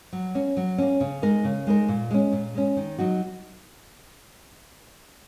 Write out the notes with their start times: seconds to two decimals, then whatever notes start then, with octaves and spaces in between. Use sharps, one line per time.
0.13 F#3
0.35 A#3 C#4
0.57 F#3
0.78 A#3 C#4
1.01 C#3
1.22 G#3 D#4 A#4
1.45 C#3
1.67 G#3 D#4 A#4
1.88 A#2
2.11 G#3 C#4
2.33 A#2
2.55 G#3 C#4
2.77 D#3
2.99 F#3 D#4 F#4